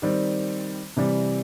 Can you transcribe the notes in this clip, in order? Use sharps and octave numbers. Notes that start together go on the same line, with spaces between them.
D#3 G3 C4
C3 E3 G3